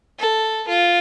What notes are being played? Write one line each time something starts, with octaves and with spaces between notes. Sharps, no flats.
A4
F4